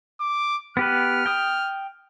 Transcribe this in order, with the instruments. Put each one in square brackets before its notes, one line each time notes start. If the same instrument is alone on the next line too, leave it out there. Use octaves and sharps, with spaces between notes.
[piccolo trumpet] D6
[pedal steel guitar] B3 G4 B4 [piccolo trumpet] F6
[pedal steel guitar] G5 D#6